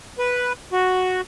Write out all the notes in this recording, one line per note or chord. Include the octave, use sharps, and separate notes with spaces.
B4
F#4